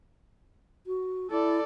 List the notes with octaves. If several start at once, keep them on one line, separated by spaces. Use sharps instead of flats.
F#4
E4 A4 D5